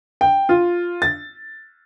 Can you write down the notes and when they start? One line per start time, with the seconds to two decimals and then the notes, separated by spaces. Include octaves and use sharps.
0.21 G5
0.49 F4
1.02 A6